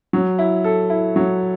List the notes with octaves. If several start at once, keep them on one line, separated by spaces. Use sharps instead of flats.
F#3
E4
A4
E4
F#3